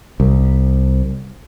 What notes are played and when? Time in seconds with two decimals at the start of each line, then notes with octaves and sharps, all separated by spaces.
0.20 C2